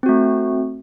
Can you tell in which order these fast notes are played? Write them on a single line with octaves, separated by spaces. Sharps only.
C4 F#4 A3